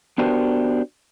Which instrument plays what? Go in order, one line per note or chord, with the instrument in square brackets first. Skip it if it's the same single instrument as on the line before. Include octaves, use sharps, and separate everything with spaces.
[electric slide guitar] B3 D4 F#4 G4 A#4 C5